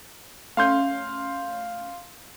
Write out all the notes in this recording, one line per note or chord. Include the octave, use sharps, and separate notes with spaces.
A3 C#4 F5 C6 G6